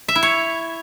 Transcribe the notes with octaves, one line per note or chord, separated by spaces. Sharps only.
E5
E4
C#5